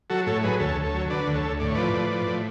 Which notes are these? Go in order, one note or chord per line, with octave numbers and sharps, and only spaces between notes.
F#3 F#4 A4
A2 A4 C#5
F#3 G#4 B4
D2 A4 C#5
D2
A4 C#5
F#3
D3 B4 D5
D2
A4 C#5
D2
A2 D5
C#5
F3 B4 D5
A2
F3
A2